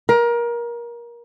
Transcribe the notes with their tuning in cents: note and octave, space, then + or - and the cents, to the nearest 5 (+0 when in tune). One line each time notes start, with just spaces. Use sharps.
A#4 +25